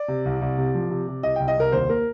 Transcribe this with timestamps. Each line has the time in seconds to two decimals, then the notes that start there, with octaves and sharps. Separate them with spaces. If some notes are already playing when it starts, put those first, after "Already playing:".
Already playing: D5
0.08 C3
0.25 C2
0.41 C2
0.58 C3
0.75 F3
0.90 C3
1.08 C3
1.23 C2 D#5
1.36 C2 G5
1.48 D#5
1.57 C2 A#4
1.72 D#2 C5
1.89 A#3 A#4